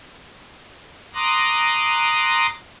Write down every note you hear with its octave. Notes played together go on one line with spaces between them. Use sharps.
A#5 C6 D6 D#6 F#6 A#6